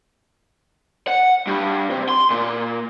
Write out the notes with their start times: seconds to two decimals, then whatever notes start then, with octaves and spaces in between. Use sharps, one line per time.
1.08 F#5
1.47 G2
1.91 C3
2.09 C6
2.30 A#2